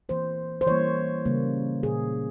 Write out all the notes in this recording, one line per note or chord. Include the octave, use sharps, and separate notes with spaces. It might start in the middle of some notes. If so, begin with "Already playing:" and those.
E3 A#3 C5
C5
E3 G3 A#3 C#5
C#3 G3 A#3
A#2 G#4